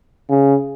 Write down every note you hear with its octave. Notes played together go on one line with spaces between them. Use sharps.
C#3